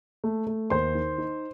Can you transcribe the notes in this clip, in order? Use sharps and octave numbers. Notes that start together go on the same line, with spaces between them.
A3
A3
D#2 C5 C6
D#3
D#4